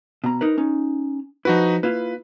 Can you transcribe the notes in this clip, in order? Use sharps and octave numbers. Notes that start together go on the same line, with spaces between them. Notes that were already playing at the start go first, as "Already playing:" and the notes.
B2 A#5
D#4 A#4 B4
C#4 D#4
F3 D#4 E4 F#4 B4
A#3 E4 F4 B4